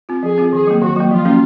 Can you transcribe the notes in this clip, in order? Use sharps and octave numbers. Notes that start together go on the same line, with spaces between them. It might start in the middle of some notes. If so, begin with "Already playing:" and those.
C4 F4
F3 G#4
C4 F4
D#3 G#4
F#3 A#3
D#3 F#4
F#3 A#3
F3 F4
A#3 C#4 F#4